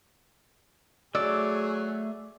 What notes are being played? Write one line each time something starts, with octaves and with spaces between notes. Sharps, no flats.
F#3 A3 G#4 D5 E6